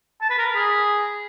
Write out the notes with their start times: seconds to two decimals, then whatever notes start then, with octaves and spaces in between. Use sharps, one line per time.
0.21 A5
0.30 B4
0.38 A#4
0.47 B5
0.55 G#4